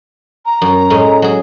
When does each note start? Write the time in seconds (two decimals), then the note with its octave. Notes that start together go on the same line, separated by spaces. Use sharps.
0.46 A#5
0.62 F#2
0.90 A2 G#3 C#4
1.22 F#3 G#4